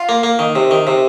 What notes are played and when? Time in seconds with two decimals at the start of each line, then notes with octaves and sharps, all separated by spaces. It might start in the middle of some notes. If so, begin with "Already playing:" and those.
Already playing: F4
0.09 A#3
0.23 A#3
0.39 D#3
0.56 C3
0.71 D#3
0.87 C3